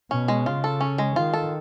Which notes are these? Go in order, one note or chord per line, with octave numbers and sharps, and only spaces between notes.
B2 C#4
G#3
C#3 F4
A4
C#4
G#3
D#3 F4
A4